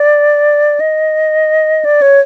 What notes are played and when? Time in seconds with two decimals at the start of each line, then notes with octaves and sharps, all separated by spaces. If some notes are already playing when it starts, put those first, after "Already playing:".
Already playing: D5
0.80 D#5
1.85 D5
2.02 C#5